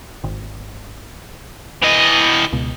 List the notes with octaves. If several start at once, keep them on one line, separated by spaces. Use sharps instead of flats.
G#1
E3 D#5
C#2 B2